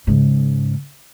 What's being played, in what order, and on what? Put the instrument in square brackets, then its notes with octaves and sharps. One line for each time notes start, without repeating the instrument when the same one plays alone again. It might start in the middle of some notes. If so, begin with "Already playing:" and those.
[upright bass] G#2 C#3